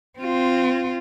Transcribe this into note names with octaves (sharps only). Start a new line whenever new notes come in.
C4 F4